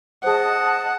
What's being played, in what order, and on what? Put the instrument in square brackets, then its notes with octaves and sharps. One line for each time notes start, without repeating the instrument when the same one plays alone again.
[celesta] G#4 C5 [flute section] D#5 A5 D#6 [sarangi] F#5